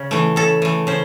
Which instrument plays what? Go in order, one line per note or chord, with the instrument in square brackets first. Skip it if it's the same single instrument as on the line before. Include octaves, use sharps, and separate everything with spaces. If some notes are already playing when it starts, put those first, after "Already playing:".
Already playing: [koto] C#3
E3 A3
C#3 A4
E3 A3
C#3 C5